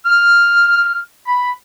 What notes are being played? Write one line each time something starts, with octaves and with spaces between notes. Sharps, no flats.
F6
B5